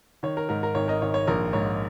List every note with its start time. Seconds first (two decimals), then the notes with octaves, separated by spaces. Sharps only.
0.23 D#3 C#5
0.37 A#4
0.49 G#2 A#4
0.63 A#4
0.75 G#1 C#5
0.88 A#4 D#5
1.02 G#1 C#5
1.14 C#5
1.27 A#1 A#4
1.53 G#2 C#5